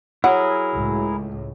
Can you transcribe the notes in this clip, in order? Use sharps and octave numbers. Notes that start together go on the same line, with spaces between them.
F#3 E4 G#4 A#4 F#5
C#2 A2